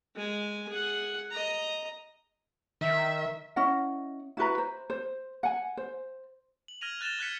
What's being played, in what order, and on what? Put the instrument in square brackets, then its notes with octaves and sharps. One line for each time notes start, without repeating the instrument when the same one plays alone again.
[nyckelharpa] G#3 G#5
G#4 F#5
D#5 A#5
[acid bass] D#3 [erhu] E5
[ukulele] C#4 E4 D#5 F#5
E4 F#4 B4 A#5
C5
C5
F#5 G#5
C5
[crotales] F#7
F6 G#6 A#6 D#7 F7
F#6 A6 E7 F7 G7
F6 F#6 G#6 B6 C#7